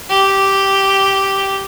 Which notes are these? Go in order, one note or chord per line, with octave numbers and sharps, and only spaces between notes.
G4